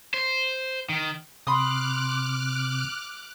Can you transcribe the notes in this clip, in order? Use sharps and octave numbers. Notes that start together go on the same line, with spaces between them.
C5
D#3
C3 B5 C6 D6 D#6 F6 F#6